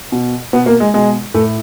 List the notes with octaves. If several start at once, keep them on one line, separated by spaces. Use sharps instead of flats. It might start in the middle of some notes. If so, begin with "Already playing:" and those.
B2
B2 B3
A#3
G#3
B2 G#3
A2 A3